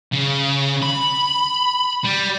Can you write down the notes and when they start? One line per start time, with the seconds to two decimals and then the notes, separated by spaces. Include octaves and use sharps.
0.13 C#3
0.83 B5
2.05 G3